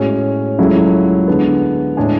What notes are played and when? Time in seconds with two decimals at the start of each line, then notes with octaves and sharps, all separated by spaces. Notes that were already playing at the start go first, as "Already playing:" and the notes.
Already playing: A2 G#3 C#4 F#4
0.58 C#2 C#3 F#3 A3 E4
1.28 D3 G#3 B3
1.97 A2 G#3 D4 G#4